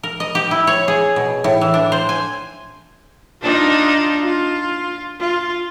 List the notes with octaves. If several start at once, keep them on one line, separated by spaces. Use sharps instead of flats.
A#4
D#5
G4
E4
C#5
G#4
B2
A2
E3
D4
C5
G#5
D4 D#4 F4
F4
F4